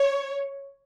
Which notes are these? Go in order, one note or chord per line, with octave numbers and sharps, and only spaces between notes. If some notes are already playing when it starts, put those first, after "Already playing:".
Already playing: C#5